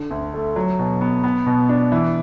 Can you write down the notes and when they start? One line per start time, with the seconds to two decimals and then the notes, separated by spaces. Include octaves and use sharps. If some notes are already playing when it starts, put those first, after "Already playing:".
Already playing: D3
0.11 D2
0.34 A3
0.56 F#3
0.79 B2
1.01 B3
1.23 B3
1.46 B2
1.69 D4
1.92 E3